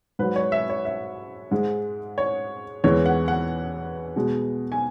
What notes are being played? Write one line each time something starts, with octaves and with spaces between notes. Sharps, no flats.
G#2 F#3 B4
C#5
E5
C#5
E5
G#2 G#3
C#5
E2 E3 G#3 C#5
F#5
F#5
B2 G#3
G#5